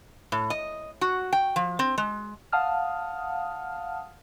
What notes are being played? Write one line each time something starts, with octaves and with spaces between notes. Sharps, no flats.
A2
D#5
F#4
G5
F3
C4
G#3
F5 F#5 A5 D#6 F6